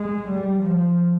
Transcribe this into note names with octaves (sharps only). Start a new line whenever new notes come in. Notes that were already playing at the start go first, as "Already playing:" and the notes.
Already playing: G#3
G3
F3